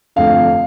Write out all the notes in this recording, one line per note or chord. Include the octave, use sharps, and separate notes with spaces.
F1 F2 D3 F5